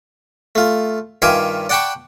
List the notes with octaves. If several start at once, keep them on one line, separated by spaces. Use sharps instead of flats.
A3 F4
G2 D#3 F4 E5 G#5 D6
D5 F#5 G5 A5 B5 C#6